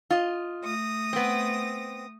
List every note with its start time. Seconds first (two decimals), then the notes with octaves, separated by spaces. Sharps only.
0.11 F4 D#5
0.63 A3 D#6 A#6
1.13 B3 C4